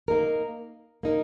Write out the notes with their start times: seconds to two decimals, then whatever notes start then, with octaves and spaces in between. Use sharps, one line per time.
0.08 A#3 D#4 A#4
1.03 A#3 D#4 A#4